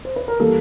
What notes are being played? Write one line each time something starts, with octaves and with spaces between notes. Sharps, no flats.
C5
B4
A#4
E3 G3 A#3 A4